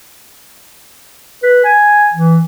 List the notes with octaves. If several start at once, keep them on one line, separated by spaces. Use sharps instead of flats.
B4
G#5
E3